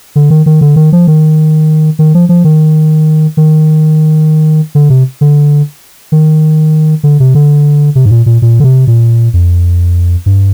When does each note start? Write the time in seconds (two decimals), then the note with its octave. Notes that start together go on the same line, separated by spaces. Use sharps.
0.16 D3
0.30 D#3
0.46 D#3
0.61 D3
0.76 D#3
0.92 F3
1.07 D#3
1.99 D#3
2.14 F3
2.29 F3
2.44 D#3
3.37 D#3
4.75 D3
4.90 C3
5.21 D3
6.12 D#3
7.03 D3
7.20 C3
7.35 D3
7.95 C3
8.05 G#2
8.11 A#2
8.26 A#2
8.42 A#2
8.60 D3
8.64 C3
8.87 A#2
9.34 F2
10.26 G2